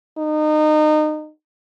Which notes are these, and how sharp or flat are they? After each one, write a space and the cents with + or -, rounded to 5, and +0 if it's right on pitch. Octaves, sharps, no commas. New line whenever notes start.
D#4 -25